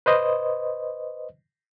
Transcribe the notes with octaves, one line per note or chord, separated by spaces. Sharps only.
B4 C5 D#5